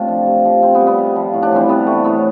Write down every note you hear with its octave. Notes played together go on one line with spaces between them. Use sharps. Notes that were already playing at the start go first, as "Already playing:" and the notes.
Already playing: C3 A3 C4 D4 F4
F3
C3
F3
C3 C4
B3
G3
B3
C3
F3
A2
D4
E3 G3 C4
C3 B3
G3 A3
A2 B3